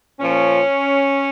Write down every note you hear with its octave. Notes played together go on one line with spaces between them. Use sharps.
A#2 F3 C#4